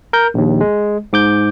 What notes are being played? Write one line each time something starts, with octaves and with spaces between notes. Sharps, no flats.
A#4 G6
A#1 D#2
G#3
G#2 D6 G6